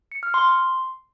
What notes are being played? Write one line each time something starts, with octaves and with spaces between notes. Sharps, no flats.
C#7
F6
C6
C6